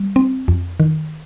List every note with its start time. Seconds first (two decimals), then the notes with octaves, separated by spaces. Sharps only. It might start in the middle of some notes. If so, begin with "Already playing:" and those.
Already playing: G3
0.16 C4
0.48 F2
0.80 D#3